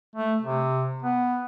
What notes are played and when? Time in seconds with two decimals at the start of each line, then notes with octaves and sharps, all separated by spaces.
0.16 A3
0.42 C3
1.03 B3